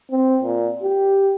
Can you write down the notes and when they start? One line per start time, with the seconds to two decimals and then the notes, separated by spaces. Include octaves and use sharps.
0.11 C4
0.42 A#2
0.83 G4